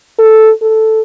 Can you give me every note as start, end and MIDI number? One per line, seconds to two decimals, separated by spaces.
0.19 0.51 69
0.62 1.01 69